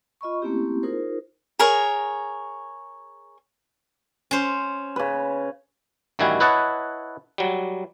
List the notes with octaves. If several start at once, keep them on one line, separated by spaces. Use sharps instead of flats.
F4 D#5 B5 C#6
A3 A#3 C4 C#4 E4 G4
D#4 F4 G#4 A#4 C5
G#4 A#4 C#5
C#4 C5
C#3 B4
A1 D#3 G3 E4 F#4 G#5
E4 B4 C#5 D#5 F#5 A5
F#3 G3